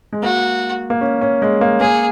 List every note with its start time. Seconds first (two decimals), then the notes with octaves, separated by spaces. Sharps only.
0.13 G#3
0.23 A#3 F#4
0.90 A#3
1.01 C#4
1.21 C#4
1.42 G#3
1.61 A#3
1.80 A#3 G#4